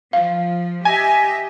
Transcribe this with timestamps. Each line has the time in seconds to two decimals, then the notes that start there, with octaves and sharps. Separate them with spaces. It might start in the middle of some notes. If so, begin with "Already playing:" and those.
0.13 F3 F5
0.85 G4 D#5 E5 G#5